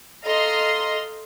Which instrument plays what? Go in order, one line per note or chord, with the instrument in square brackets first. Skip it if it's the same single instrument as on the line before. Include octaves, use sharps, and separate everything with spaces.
[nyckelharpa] A4 F5 [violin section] D#5 A#5 C6